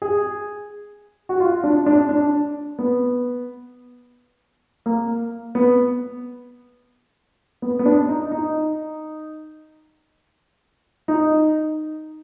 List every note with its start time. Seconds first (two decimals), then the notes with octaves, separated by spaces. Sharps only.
0.02 G#4
1.29 F#4
1.40 F4
1.64 D4
1.86 D4
2.09 D4
2.79 B3
4.86 A#3
5.55 B3
7.62 B3
7.79 B3
7.85 D4
8.09 D#4
8.32 D#4
11.08 D#4